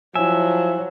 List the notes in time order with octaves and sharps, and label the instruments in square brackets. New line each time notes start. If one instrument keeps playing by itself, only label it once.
[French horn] F3 [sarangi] F#3 [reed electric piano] E4 G#5 [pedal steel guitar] E5